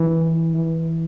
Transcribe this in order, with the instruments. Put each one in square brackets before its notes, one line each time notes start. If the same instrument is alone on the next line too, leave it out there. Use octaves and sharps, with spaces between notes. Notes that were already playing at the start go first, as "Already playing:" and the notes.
Already playing: [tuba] E3
E3